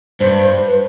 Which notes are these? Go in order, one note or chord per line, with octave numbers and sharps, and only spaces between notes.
G2 C5
C5
B4